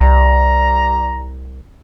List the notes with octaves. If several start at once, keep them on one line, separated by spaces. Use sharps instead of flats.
C2 G3 A#5